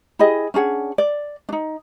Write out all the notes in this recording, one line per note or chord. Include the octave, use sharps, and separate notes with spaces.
E4 G4 G#4 D#5
C#4 D4 G#4 F#5
D5
D4 D#4